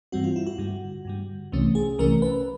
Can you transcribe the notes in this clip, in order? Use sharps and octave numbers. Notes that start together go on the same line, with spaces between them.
G2 E3 G3 C4 F#4
F4
E4
F#4
G2 D3 G3
G2 D3 G3
C2 C3 E3 A3 C#4
G#4
C2 C3 E3 A3 C#4 A#4
B4